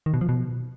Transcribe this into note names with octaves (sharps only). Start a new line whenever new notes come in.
D#3
B2
F3
B2